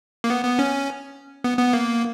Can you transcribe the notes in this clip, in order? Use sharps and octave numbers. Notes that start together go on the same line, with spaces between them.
A#3
B3
B3
C#4
B3
B3
A#3